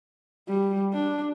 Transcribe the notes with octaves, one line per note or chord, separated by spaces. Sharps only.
G3
D4